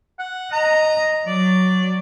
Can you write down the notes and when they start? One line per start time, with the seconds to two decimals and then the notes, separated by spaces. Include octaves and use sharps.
0.19 F#5
0.52 D#5 A#5
1.27 F#3 D5